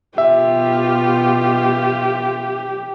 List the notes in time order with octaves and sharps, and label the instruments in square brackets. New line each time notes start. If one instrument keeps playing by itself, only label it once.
[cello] B2 F4 [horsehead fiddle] G4 [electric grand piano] E5